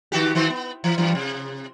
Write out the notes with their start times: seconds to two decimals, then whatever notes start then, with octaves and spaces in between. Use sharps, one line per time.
0.12 D#3 F#4 G4
0.35 D#3 F#4 C5
0.50 B3
0.84 E3
0.98 G2 E3
1.15 C3